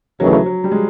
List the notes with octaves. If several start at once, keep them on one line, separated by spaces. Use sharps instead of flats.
D#2 C#3 E3 F#3 A3
F#3
G3
G#3